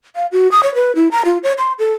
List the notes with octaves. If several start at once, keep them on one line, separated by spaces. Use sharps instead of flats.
F5
F#4
D#6
C#5
B4
E4
A#5
F4
C#5
C6
A4